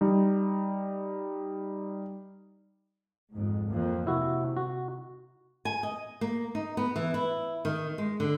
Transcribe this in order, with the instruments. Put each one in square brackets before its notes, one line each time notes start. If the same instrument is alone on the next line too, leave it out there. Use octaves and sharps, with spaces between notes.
[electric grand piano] G3 D#4
[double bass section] F2 G#2
F2 A#3
[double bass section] C3 [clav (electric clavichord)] E4 F#4
[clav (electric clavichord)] F#4
[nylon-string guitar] G#5
D#5
A#3
D#4
B3
E3
E4
D#3
G#3
D3